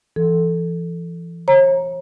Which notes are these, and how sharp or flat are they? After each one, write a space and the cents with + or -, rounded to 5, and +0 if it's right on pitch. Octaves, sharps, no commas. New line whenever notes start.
E3 +35 A4 +0
C#5 -40 A#5 +0